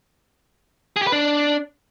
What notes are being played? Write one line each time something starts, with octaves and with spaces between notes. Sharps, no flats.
G#4
G4
B4
D4